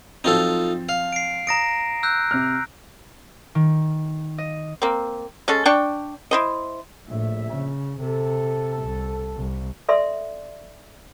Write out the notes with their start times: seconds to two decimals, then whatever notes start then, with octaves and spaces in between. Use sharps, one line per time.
0.24 F3 F#3 C4 D#4 F4 A4
0.89 F5
1.13 C7 D7
1.47 A#5 D#6 A#6 D7
2.03 E6 F#6 G6
2.31 C3 F6
3.55 D#3
4.38 D#5
4.82 A#3 C4
5.48 G#3 C#4 A4
5.65 D4 D5 G5 C#6
6.31 E4 C5 D#5
7.08 A#1 A2 E5
7.51 C#3
8.00 C3 A4
8.83 C2
9.35 C2
9.89 A4 D5 E5 C6